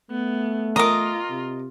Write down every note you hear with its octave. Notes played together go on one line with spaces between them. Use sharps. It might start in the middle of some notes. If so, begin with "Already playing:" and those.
A3 B3
F4 A#4 D#5 A#5 D6 D#6
C3